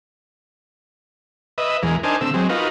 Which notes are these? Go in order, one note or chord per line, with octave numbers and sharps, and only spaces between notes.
B4 D#5 E5
E2 E3 G#3 A#4
D4 D#4 A#4 C5 G#5 A5
D3 A3 C4 E6
F#3 G#3 C4
D#4 F4 F#4 A#4 B4